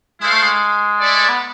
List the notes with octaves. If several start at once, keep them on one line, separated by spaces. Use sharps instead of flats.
G#3 E4 A4 C5 F5
A3
G#3
A3 E4 A4 D5
B3